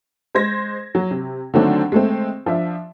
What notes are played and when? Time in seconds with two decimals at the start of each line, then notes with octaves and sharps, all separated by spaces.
0.35 G#3 C5 G#6 A#6
0.95 F#3
1.11 C3
1.54 D3 D#3 F#3 A3 C4 D4
1.92 G#3 A3 C4
2.46 F3 D4 E5